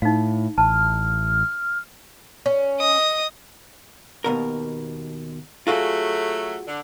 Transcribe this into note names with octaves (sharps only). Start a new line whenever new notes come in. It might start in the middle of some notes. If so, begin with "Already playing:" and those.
A2 D#4 F5
A1 A5 F6
C#4
D#5 D#6
D#2 B2 A#4
F#3 A3 F4 F#4 G#4
D3